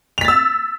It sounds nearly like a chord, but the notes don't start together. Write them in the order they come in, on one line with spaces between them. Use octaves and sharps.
F7 B6 A6 E6